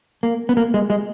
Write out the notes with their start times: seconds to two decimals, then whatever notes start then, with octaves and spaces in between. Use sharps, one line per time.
0.23 A#3
0.49 B3
0.57 A#3
0.74 G#3
0.90 G#3